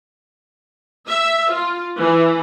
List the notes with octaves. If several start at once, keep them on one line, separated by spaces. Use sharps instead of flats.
E5
F4
E3